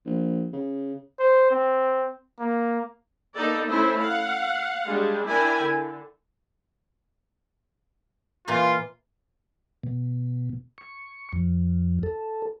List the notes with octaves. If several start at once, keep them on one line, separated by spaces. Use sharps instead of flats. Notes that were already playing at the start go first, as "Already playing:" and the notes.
A#1
C#3
C5
C4
A#3
A#3 B3 D#4 A4 D5
A3 C#4 E4 C5 E5
F5 F#5
G3 G#3 D4
D4 E4 A#4 G5 G#5
D3
A#2 E3 A#3 F4
B2
C#6
F2
A4